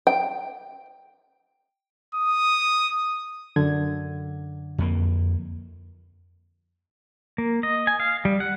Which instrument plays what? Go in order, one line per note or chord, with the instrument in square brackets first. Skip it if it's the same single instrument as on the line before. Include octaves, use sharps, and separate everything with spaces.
[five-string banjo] G5
[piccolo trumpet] D#6
[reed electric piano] F#2 D3 G#6
[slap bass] F2 A#3
[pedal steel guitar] A#3
D#5
G#5
F5
G3
F#5